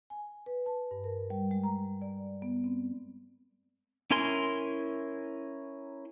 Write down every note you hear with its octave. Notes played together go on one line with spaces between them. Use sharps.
G#5
B4
A5
G2
A#4
G3
G#3
A#5
D5
B3
C4
C#4 E4 A#4 G#5 C6